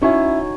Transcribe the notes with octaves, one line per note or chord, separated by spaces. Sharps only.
C#4 D#4 E4 F#4 C#5 G#5